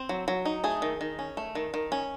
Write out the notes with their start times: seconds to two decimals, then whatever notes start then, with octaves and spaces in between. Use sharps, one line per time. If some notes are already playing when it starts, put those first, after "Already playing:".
Already playing: C4
0.09 F#3
0.28 F#3
0.45 D#4
0.64 A3 G#4
0.82 D#3
1.01 D#3
1.19 C#4
1.37 A3
1.55 D#3
1.74 D#3
1.92 C#4